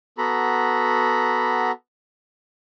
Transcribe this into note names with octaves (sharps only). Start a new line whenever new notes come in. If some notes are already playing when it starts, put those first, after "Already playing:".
B3 F#4 A4 A#5 B5